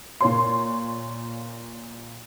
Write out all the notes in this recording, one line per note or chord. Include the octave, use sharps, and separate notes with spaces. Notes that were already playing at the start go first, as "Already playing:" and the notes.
A#2 A#3 C#5 C6